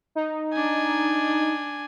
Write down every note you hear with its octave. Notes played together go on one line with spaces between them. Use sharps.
D#4
D4 G#5